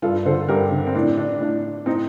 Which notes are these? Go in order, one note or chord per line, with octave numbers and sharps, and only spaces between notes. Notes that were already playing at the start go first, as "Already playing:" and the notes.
G2 F4 A4
D3 A4 C5
G2 G4 A#4
D3
C4
A2 D4
D4
A2 D4
A2 C4 D#4